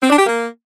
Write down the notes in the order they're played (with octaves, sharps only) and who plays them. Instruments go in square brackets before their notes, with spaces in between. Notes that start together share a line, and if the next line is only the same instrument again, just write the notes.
[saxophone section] C4
D4
G4
A#3